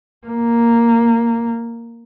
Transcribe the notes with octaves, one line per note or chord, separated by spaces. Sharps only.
A#3